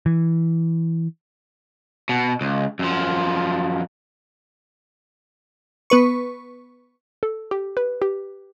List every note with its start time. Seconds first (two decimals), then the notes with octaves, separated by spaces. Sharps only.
0.06 E3
2.09 B2
2.41 C#2
2.79 F#2 F3
5.90 B3 B4 C#6
7.23 A4
7.51 G4
7.77 B4
8.02 G4